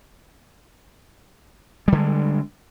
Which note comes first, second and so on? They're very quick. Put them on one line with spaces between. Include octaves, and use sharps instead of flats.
G3 D3 G#3